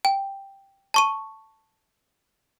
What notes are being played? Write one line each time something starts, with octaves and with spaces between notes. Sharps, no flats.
G5
A5 C#6 D#7